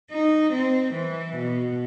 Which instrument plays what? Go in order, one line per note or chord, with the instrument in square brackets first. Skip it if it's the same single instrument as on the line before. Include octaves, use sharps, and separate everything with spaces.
[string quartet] D#4
C4
E3
B2